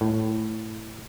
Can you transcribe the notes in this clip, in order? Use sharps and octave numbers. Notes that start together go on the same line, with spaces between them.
A2